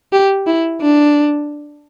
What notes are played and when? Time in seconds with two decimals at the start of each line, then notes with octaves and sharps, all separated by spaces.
0.13 G4
0.47 E4
0.82 D4